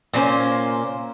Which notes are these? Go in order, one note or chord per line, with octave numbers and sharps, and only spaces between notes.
A#2 A#3 C#4 C5